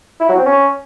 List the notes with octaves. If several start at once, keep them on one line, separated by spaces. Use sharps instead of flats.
E4
F#3
C4
C#4